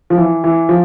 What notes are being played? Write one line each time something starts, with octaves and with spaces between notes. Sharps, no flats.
F3
E3
E3
F3